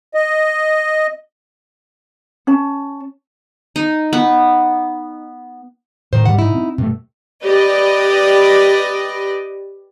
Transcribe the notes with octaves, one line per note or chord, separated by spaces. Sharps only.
D#5
C#4 A5
D#4
B3
A2 D#3 C5
G#2 B2 G3 F#5
D#4 E4
C4
G2 B2 A3
G4 B4 D5 D#5